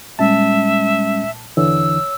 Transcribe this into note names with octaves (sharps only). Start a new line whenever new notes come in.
A#2 G3 G#3 C#4 E5 A5
E2 D3 E3 C#5 E6